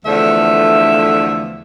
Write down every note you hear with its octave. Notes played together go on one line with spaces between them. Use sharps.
E2 D3 F3 A3 D4 E5